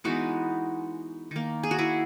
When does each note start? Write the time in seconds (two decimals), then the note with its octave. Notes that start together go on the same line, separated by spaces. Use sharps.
0.04 E3 G#3 B3 D#4 F#4
1.31 D#3 A#3
1.63 G#4
1.71 F#4
1.78 E4 G#4